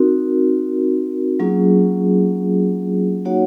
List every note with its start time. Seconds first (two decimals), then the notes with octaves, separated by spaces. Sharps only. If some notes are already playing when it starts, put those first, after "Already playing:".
Already playing: C4 D#4 F#4 A#4
1.39 F#3 A#3 C#4 F4 G#4
3.25 A#3 D#4 F#4 C#5 F#5